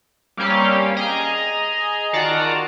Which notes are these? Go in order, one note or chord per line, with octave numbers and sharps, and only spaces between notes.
G3 A#3 C4 C#4 G4 F5
G#4 D#5 G#5 A#5
D#3 F4 F#4 D5 A5 A#5